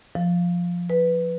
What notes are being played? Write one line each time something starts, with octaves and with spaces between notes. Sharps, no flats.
F3
B4